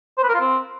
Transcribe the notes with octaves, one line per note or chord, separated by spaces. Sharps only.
C5
B4
A#4
F4
C4